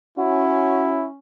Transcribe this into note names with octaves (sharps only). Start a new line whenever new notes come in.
C#4 E4 F#4